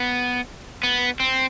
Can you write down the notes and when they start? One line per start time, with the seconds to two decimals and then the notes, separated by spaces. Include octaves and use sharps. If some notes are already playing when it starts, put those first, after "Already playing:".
Already playing: B3
0.83 B3
1.20 C4